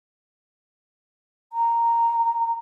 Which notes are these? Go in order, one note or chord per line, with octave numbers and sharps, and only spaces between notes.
A#5